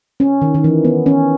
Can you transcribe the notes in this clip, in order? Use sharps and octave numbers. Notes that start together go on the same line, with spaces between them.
C#4
D#3
D#3
E3
B3
C#4